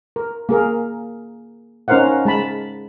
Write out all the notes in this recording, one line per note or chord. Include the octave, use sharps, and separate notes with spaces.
A#4
A#3 G#4 A#4
C#4 D#4 A#4 C5 F5 F#5
G#3 A5 B5